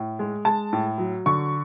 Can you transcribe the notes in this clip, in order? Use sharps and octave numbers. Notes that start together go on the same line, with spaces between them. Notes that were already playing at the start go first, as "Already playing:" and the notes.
Already playing: A2
G#3
G#3 A5
A2
F#3
D3 C#6